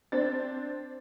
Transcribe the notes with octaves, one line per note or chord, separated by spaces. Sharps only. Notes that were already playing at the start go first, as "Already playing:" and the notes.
C4 D4 A6